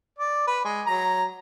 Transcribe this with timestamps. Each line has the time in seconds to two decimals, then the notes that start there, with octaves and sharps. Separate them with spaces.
0.18 D5
0.47 B4
0.64 G#3
0.87 F#3 A#5